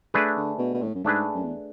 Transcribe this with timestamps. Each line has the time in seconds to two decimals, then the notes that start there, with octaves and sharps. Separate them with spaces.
0.14 A3 D4 G#4 B4
0.36 D3
0.59 B2
0.74 B2
0.82 A2
0.95 F#2
1.04 G#2 A3 D4 G#4 B4
1.35 F#2
1.44 E2